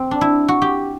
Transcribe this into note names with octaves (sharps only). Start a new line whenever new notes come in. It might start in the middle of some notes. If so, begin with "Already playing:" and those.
Already playing: C4
D4
E4
F#4
G4